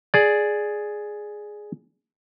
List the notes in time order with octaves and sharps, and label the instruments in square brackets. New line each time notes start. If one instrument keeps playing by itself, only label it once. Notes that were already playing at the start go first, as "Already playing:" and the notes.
[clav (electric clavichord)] G#4 D5